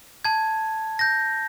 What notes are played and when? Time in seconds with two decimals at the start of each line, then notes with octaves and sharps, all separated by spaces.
0.25 A5 G#6
0.99 G6 A#6